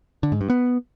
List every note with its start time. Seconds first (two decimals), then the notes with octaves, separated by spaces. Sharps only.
0.23 D3
0.32 G#2
0.41 G2
0.50 B3